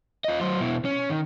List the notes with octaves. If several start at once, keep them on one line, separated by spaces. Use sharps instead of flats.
F4 D#5
F#3 C5
B2 E4
C#4
D#3